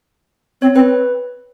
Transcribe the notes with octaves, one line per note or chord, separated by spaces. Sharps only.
C4 C#5
C4 B4